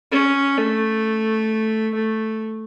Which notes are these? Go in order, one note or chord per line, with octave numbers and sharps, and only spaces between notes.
C#4
A3
A3